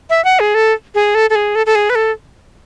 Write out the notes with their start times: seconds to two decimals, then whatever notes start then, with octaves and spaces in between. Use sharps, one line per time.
0.10 E5
0.25 F#5
0.40 G#4
0.55 A4
0.95 G#4
1.15 A4
1.30 A4
1.35 G#4
1.55 A4
1.66 A4
1.75 G#4
1.90 B4
1.95 A4